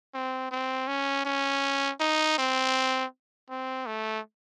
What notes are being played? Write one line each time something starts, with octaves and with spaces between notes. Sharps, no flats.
C4
C4
C#4
C#4
D#4
C4
C4
A3